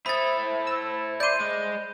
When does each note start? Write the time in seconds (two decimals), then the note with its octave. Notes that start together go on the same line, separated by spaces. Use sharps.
0.06 E4 A4 C5 B5 D#6 A6
0.67 E6
1.20 D5 C6 G6 D#7
1.40 G#3